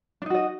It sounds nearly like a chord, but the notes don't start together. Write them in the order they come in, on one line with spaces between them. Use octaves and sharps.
D4 D#4 F#4 D#5